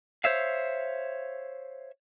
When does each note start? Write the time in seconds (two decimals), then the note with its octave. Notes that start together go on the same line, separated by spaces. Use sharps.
0.24 C5 C#5 E5 F5